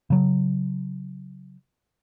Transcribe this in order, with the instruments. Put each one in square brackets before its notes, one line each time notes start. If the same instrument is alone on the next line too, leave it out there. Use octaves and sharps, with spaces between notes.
[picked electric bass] C#3 F#3